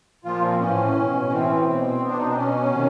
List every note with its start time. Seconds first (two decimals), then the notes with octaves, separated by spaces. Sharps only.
0.24 A#2 F3 F4
0.42 C4
0.59 A2 E3 C#4
0.94 B2
1.29 A2 E3 C4
1.65 B2
2.00 B2 B3
2.09 D4
2.18 D#4
2.27 D4
2.35 B2 C#4
2.70 C3 D#3